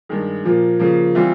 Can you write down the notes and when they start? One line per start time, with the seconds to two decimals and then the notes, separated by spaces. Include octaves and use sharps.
0.09 G2 D#3 G#3
0.44 A#2 F3 A#3
0.79 C#3 F3 A#3
1.15 E3 G3 C4 F4